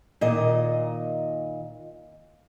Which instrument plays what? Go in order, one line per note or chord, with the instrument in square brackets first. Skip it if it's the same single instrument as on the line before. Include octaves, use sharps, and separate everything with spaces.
[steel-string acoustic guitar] A#2 D#3 D#5